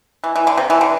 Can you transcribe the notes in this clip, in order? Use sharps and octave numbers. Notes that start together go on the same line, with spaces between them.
E3
E3
D3
C3
E3
D3